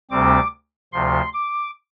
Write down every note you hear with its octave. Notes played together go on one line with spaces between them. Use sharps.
D2 C3 G3 C4 D6
D2 C3 F3 C6
D6